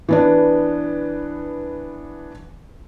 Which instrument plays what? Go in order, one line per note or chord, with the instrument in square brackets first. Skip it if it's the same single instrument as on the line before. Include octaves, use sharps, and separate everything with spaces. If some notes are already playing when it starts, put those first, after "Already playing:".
[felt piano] E3 B3 D4